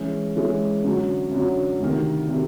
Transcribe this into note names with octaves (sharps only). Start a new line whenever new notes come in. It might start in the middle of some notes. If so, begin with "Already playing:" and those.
Already playing: E3 G#3 C#4
E3 G#3 C#4
F#2 D3 F#3
F#2 D3 F#3
D2 C3 D#3
C3 D#3